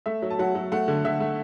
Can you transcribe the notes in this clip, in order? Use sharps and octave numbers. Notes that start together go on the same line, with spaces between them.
A3 E5
F#3
A5
F#3 F#5
F#3
A3 F#5
D3
D3 E5
A3